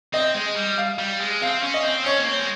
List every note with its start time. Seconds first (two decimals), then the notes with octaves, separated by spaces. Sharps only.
0.13 C4 D#5
0.35 G#3
0.56 G3
0.78 F5
0.98 G3
1.21 G#3
1.41 C4 F5
1.63 C#4
1.74 D#5
1.85 C4
2.05 C#4 C#5
2.18 A#3
2.27 C4
2.40 G#3